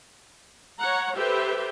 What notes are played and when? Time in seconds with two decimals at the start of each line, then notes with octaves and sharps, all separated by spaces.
0.78 C#5 F#5 A#5
1.17 G4 A4 B4 C5 E5 G5